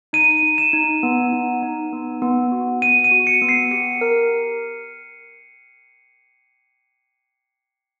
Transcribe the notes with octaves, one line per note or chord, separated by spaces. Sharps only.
D#4 D#7
D#4
E7
D#4
B3
D#4
D#4
B3
B3
F#4
B3 D#7
D#7
F#4
C#7
B3
C7
G4 C#7
A#4